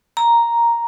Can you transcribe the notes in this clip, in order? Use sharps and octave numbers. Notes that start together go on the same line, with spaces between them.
A#5